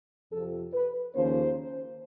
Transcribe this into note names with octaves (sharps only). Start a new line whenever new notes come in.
F2 C3 F3 A4
B4
D#2 C#3 F3 A#3 C#4 C5